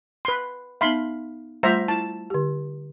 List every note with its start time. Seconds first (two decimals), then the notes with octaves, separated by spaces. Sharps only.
0.25 B4 C6
0.81 B3 D#4 E5 F5 B5 C6
1.63 G3 A3 F4 C5 E5 A#5
1.88 E4 A5
2.30 D3 G4